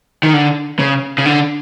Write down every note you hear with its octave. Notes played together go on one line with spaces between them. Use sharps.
D#3
D3
C#3
C#3
D3